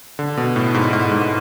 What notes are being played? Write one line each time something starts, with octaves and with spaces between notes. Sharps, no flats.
D3
B2
A2
G#2
G#2
G#2